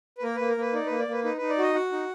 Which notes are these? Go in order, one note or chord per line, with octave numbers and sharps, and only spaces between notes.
B4
A#3 A#4
A#3 B4
A#4
A#3 B4
D#4 D5
A#3 B4
D5
A#3 B4
D#4 B4
D#4 B4
D5
F#4 D#5
F#4 F#5
D#4